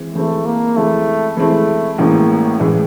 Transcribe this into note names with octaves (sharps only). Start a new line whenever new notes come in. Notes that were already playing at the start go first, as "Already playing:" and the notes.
Already playing: E3 G#3 C4
E3 G#3 A3 C4 E4
A#3
E3 G#3 A3 C4 E4
E3 G#3 A3 C4 E4
A1 A2 E3 G#3 A#3
A1 A2 E3 G#3